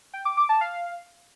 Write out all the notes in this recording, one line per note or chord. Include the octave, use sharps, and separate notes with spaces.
G5
D6
D6
A5
F5